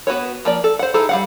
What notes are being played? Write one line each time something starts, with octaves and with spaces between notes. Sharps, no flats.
B3 F#4 B4 C#5
F3 A#3 D5
A4
C5 F#5
D#4 E4 G#4 A4
G3 F5 F#5